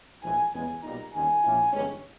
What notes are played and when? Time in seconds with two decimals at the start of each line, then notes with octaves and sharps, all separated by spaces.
0.23 A#1 G#2 E3 G#5
0.53 E2 C#3 G#3 B3 G#5
0.83 B1 A#2 G3 B3 D#4 A#5
1.13 D#2 D#3 G3 C#4 G#5
1.43 A#1 A#2 A#3 C#4 E4
1.73 G1 G2 E3 G#3 C#4